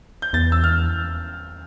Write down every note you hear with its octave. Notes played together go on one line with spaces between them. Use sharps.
G6
E2 A6
E6
F6